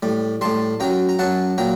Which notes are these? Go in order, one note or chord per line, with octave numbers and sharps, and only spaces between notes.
A2 G3
A2 G3 A5 C6
F#2 F#3 G5 A#5
A#5
F#2 F#3 F#5 A5
A#2 F#3 G5 A#5